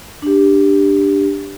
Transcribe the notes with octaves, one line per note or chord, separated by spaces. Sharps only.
D4 G4